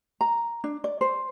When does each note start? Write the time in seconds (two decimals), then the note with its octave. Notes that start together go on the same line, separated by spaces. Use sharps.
0.21 A#5
0.64 D4
0.84 D5
1.01 C5